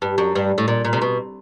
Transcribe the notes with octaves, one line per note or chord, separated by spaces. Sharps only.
G2
F#2
G2
A2
A#2
A#2
C3
B2